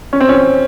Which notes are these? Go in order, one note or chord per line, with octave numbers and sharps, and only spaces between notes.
C#4
C4
C#4